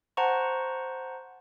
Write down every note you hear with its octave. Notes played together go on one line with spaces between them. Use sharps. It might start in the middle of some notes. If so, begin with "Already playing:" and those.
C5 F#5 A5 A#5 C#6